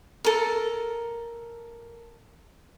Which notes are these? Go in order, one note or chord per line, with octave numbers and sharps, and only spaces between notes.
A4 A#4